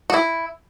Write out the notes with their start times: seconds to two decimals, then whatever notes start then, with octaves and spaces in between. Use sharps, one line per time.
0.10 F#4
0.14 E4